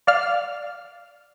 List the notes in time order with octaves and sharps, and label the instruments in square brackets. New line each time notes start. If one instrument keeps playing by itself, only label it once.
[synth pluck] D5 F5 F6